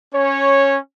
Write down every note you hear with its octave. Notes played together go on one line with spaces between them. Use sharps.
C#4 C#5